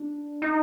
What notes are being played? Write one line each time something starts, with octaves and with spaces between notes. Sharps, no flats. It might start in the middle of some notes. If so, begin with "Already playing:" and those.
Already playing: D4
D#4